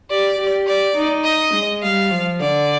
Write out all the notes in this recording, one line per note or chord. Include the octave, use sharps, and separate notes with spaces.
G4 D5
G4
D5
D#4
D#5
G#3
G3 F5
F3
D3 D5